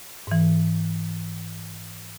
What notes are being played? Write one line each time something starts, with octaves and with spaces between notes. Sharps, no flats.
G#2 E3